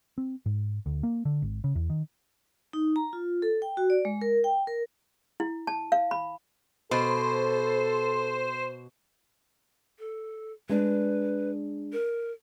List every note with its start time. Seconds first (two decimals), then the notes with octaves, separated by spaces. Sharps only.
0.18 C4
0.46 G#2
0.86 D2
1.03 A#3
1.25 D3
1.42 G#1
1.64 C#3
1.75 E2
1.90 D#3
2.73 D#4
2.96 A#5
3.13 F4
3.42 A4
3.62 G5
3.77 F#4
3.90 D5
4.05 G#3
4.22 A#4
4.44 G5
4.67 A#4
5.40 E4
5.67 A5
5.92 F5
6.11 B5
6.91 B2 A4 C5
9.99 A4
10.69 G#3 D4 B4
11.93 A#4